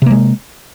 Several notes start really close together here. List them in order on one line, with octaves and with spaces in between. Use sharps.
C3 A#3 G#3